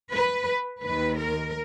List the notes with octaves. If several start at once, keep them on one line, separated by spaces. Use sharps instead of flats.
B4
D#2 D#3 B4
A#4